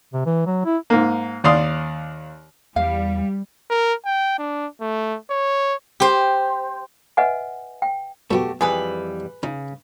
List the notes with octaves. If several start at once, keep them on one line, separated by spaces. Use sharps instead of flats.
C3
E3
F#3
E4
G#2 A#3
D#2 D5 F5 C6 D#6
E2 G3 F5
A#4
G5
D4
A3
C#5
G4 C5
B4 D#5 E5 F#5 G#5
G5
F#2 B2 A3 F#4 G4
F2 E3 G3 G#4 B4
C#3 D#4